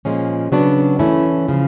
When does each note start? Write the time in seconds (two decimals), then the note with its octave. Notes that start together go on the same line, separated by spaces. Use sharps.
0.05 A#2 F3 G#3 C#4
0.52 C#3 F#3 B3 D4 F#4
0.99 E3 A3 C#4 E4
1.48 C#3 F3